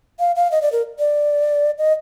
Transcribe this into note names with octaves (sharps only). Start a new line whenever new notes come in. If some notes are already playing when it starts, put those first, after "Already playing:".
F5
F5
D#5
D5
A#4
D5
D#5